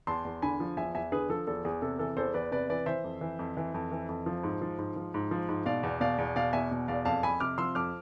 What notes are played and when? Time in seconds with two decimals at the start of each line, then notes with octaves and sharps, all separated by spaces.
0.07 E2 A5 C6
0.25 E2
0.42 D3 G#5 B5
0.60 F3
0.77 E2 E5 G#5
0.95 E2 E5 G#5
1.12 D3 G#4 B4
1.29 F3 A4
1.47 E2 A4
1.65 E2 G#4
1.82 C3 A4
1.99 E3 A4
2.17 E2 A4 C5
2.34 E2 B4 D5
2.51 C3 B4 D5
2.69 E3 B4 D5
2.86 E3 C5 E5
3.04 F2
3.21 E3
3.39 F2
3.57 E3
3.74 F2
3.92 E3
4.09 F2
4.26 F3
4.43 G#2
4.62 F3
4.79 G#2
4.96 F3
5.14 G#2
5.31 F3
5.49 G#2
5.66 B2 D5 F5
5.83 E2
6.00 B2 D5 F5
6.18 E2
6.36 B2 D5 F5
6.53 E2 E5 G#5
6.71 B2
6.88 E2 D5 F5
7.05 F2 F5 A5
7.23 F2 G#5 B5
7.40 C3 D6 F6
7.58 F3 C6 E6
7.75 F2 D6 F6